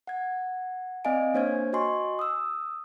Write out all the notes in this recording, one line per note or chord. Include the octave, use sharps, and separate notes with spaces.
F#5 G#6
C4 D5 D#5 F5 G#5 D7
A#3 D4 C5 C#5 F6 G#6
F#4 D#5 G#5 C6 C#6
D#6 E6